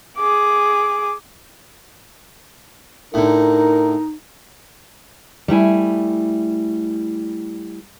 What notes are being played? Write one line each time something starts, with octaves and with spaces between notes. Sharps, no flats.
G#4 D6
A2 D3 D#4 A#4
G3 A3 E4 G#5